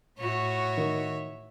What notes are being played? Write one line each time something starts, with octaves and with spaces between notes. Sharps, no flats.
A2 F#4 C#5 E5
D#3